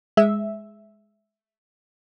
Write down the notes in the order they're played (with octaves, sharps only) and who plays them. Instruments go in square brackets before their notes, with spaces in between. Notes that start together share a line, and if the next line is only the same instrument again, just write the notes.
[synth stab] G#3 E5